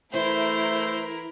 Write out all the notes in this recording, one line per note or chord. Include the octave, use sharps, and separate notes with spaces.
E3 A3 E4 A#4 C5